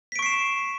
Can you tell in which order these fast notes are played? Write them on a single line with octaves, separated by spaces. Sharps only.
B6 D7 C#6 C7 E7